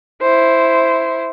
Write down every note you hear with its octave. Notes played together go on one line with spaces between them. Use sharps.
E4 C5